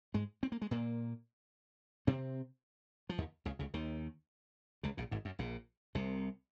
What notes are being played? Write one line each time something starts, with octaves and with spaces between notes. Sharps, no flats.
G#2 G#3
C4
A#3
G#3
A#2 A#3
C3 C4
F3
D#2 D#3
C#2 C#3
C#2 C#3
D#2 D#3
C#2 C#3
A#1 A#2
G#1 G#2
F#2
A#1 A#2
C2 C3